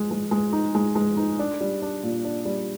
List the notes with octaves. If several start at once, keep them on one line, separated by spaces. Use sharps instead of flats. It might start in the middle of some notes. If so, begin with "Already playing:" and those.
Already playing: G#3
G#3
G#3
D#4
G#3
G#3
D#4
D4
G3
D4
A#2
D4
G3